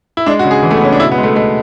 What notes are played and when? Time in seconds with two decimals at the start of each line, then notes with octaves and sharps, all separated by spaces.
0.17 E4
0.26 G#3 D4
0.39 F#4
0.44 C#3
0.51 G#4
0.63 E3
0.71 A3
0.77 B3
0.81 C#3 C#4
0.92 D4
0.99 B2 E4
1.12 B3
1.18 G#3
1.23 A3
1.36 G#3 A3